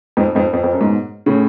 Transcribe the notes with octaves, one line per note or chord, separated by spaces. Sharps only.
F2 G#2
F2 G#2
F2
F2
F#2
G#2 B2
A2 C#3